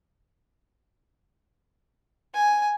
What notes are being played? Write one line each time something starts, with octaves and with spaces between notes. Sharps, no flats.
G#5